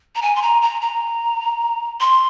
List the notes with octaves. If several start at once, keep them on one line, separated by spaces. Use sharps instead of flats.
A#5
G#5
C6
A#5
A#5
A#5
C6